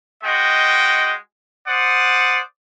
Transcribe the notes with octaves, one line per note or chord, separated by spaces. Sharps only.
G#3 F#4 D#5 G5
C5 D5 F#5 D#6